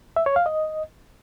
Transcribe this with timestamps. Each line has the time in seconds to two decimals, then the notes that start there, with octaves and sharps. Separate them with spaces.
0.16 E5
0.26 C#5
0.36 F5
0.46 D#5